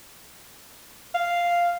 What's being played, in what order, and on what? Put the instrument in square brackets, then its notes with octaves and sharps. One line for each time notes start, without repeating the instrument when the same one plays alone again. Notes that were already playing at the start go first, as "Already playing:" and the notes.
[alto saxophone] F5